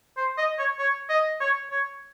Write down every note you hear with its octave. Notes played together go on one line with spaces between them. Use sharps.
C5
D#5
C#5
C#5
D#5
C#5
C#5